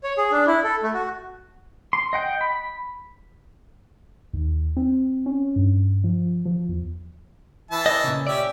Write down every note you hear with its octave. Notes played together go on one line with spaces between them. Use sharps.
C#5
G#4
D4
E4
A4
A3
F#4
C6
D#5 F#5 G5
B5
D#2
C4
C#4
G2
F3
F3
E2
E3 E5 A5
D#5
A#2 C#3
C#4 G4 D5 E5